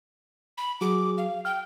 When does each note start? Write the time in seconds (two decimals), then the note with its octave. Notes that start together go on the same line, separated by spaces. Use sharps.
0.58 B5
0.81 F#3 F#4 G#4 D6
1.18 F5
1.45 G5 F6